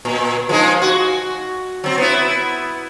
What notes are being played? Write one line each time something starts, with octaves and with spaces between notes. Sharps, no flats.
A#2
F3 G#3 D#4
F#4
F#3 C4
B3 E4